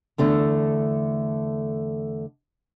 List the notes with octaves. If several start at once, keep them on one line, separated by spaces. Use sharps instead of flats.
E2 D3 A3